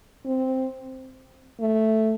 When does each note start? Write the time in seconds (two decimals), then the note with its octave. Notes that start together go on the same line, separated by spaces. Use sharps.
0.25 C4
1.60 A3